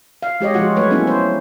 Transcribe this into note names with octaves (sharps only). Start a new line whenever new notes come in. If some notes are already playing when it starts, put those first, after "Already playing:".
F5
G#3 G4 C#5 D#5
F3 G#3 F4 F#4 F#5
F#3 A3 B4 C#5
G3 A#3 B3 C#4 E4
C5